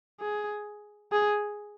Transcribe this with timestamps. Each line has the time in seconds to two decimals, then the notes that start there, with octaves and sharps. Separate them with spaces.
0.20 G#4
1.12 G#4